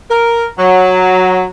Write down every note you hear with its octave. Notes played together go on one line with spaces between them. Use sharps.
A#4
F#3